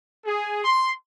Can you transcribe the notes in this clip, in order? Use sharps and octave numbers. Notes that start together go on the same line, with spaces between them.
G#4
C6